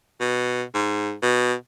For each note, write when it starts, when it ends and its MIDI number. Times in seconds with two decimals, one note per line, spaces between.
0.21 0.63 47
0.75 1.14 44
1.23 1.54 47